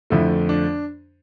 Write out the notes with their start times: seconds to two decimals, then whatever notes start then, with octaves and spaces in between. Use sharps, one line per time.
0.10 F2 D3 F3 A3 E4
0.49 D4